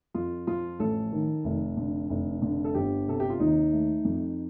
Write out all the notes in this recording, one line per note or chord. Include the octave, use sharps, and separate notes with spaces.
F2 F4
F3 F4
A1 A4
D#3
F1
D3
F1
D3
A4
G1 G4
C3 A4
G4
F4
D#2 D#4
A3
F2